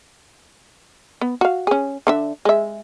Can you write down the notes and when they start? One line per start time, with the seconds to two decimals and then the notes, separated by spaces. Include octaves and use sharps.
1.21 B3
1.41 F#4 F5
1.67 C#4 G#4
2.07 D3 D4 E5
2.45 G#3 E5